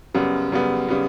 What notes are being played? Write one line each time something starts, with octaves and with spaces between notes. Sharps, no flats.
F#2 C#3 G3 B3
F#2 C#3 G3 B3
C#3 G3 B3